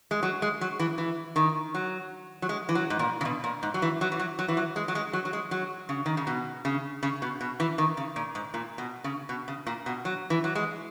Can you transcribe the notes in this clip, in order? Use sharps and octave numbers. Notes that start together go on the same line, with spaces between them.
G#3
F#3
G#3
F#3
E3
E3
D#3
F#3
F#3
G#3
E3
F#3
G#2
A#2
C#3
B2
A#2
G#2
F#3
E3
F#3
E3
F#3
F#3
E3
F#3
G#3
F#3
G#3
F#3
F#3
G#3
F#3
C#3
D#3
C#3
B2
C#3
C#3
B2
B2
E3
D#3
C#3
A#2
G#2
A#2
B2
C#3
B2
C#3
A#2
B2
F#3
E3
F#3
G#3